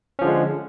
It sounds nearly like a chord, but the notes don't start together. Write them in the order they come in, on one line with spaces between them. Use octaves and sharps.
C#4 F3 D3 G#3